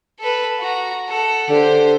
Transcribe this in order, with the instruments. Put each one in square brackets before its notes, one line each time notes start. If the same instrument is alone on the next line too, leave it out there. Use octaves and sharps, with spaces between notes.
[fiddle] A4 B4
F#4 A#5
A4 F#5
[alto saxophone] D3 [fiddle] G4 C5